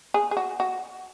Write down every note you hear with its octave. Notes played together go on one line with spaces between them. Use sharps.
G#4
G#4
F#4
F#4